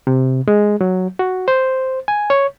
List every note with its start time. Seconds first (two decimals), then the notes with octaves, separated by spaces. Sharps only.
0.07 C3
0.48 G#3
0.81 F#3
1.19 F#4
1.48 C5
2.08 G#5
2.30 C#5